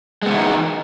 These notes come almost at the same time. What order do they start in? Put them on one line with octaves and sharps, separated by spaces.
G#3 B3 D3 E3 D#4